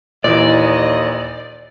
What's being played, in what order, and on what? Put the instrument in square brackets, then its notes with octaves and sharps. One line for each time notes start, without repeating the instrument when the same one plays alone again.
[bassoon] D#2 [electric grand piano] A#2 E3 [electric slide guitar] D5 [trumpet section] D#5